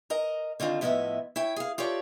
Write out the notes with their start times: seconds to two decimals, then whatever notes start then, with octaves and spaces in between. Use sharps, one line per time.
0.10 A#4 D#5 A#5
0.60 D3 D#3 C4 F4
0.81 A2 F3 B3 E4 D#5 E5
1.36 E4 C#5 G5
1.56 G#4 F5
1.78 F4 G4 A4 C#5 D5